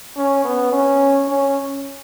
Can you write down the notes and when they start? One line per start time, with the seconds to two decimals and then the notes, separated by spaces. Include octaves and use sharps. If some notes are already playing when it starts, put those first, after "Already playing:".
0.16 C#4
0.45 B3
0.72 C#4
1.28 C#4